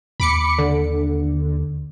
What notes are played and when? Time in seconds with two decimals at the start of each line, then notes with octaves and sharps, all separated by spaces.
0.20 D#2 B5 D6 C#7
0.59 D3